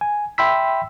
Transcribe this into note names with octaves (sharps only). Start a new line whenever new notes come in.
G#5
E5 G5 B5 C6 E6 B6